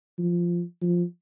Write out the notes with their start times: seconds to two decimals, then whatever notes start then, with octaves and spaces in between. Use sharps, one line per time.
0.19 F3
0.82 F3